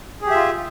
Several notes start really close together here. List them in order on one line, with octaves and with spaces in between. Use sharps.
G#4 G4 E5 F4